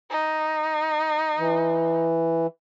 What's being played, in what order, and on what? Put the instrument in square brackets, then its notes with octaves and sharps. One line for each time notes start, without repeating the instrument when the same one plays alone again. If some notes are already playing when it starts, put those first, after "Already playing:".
[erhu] D#4
[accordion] E3